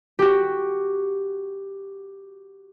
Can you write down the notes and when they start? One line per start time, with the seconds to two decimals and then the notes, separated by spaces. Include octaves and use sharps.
0.19 F#4 G4